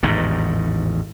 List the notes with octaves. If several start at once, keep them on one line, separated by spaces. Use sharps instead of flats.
A1 E2 G#2 D#3